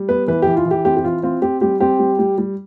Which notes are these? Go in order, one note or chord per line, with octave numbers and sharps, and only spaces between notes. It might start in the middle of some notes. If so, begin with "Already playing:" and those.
Already playing: G3
B3 B4
E3 B4
E3 G4
F4
E3
G4
C4 G4
G4
E3 F4
C4 F4
C4 G4
G3 G4
C4 G4
G3
G3
G3